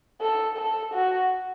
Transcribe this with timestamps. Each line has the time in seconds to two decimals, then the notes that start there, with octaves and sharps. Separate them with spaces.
0.21 A4
0.57 A4
0.94 F#4